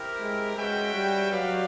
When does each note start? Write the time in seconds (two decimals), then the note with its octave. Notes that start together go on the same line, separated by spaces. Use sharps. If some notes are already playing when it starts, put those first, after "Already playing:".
Already playing: C4 E4 G4 A#4
0.20 G#3
0.57 G#3 C#4 F#4 B4 E5 G5
0.94 G3
1.31 F#3 F#4 B4 D5 F5